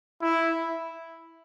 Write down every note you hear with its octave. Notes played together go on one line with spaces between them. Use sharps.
E4